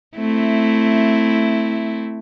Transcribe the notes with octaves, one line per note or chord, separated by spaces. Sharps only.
A3 C4 E4